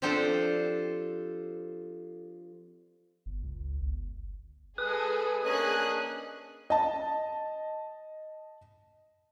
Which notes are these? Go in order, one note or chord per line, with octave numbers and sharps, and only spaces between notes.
F3 C4 D4 G4 A4 C5
G1
C#2
G1
G#3 G#4 A4 B4 D#6
A#3 C#4 D4 G#4 D#5 G#5 F#6
D#5 A5